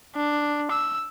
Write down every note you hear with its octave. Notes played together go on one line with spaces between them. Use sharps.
D4
E6